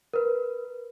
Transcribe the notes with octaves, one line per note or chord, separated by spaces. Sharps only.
A#4 B4